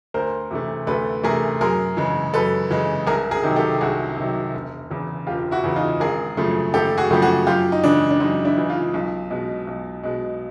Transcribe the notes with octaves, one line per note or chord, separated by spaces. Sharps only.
D2 A#4 C5
C3 E3 A3
D2 A4 B4
C3 E3 A3 G#4 A#4
F#2 G#4 A#4
C#3 E3 G#3
F#2 A4 B4
C#3 E3 G#3
C2 G#4 A#4
G#4 A#4
C3 D#3 F#3
G4 A4
C2 F#4 G#4
C3 D#3 F#3
E1
E2 C#3 E3
E1 F4 G4
E4 F#4
E2 C#3 E3
D#4 F4
G#1 G#4 A#4
F#2 C#3 F3 A3
G#1 G4 A4
F#4 G#4
F#2 C#3 F3 A3 G4
F#4 G#4
F#2 F4 G4
D#4
C#3 E3 G#3 D4
D4
F#2 D#4
D4 E4
C#3 E3 G#3
D#4 F4
B1
B2 G#3
B1
B2 G#3